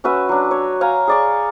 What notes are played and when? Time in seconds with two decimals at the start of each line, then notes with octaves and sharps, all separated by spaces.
0.04 C#4 F#4 B4 E5
0.29 F#3 D4
0.51 C#5
0.81 C#5 F5 G#5 A#5
1.07 G#4 D5 C#6